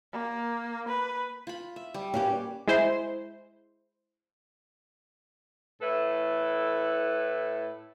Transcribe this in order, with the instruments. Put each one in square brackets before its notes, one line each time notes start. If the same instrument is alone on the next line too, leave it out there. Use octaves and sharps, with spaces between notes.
[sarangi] A#3
B4
[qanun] F4 B5
E5
G3
[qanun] A#3 B4 D5 [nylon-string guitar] C#4 G4
[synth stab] G#3 E4 C5
[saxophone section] A2 E4 A4 B4